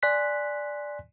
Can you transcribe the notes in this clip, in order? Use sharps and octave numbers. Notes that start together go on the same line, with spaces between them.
D5 G#5 C6 F#6 B6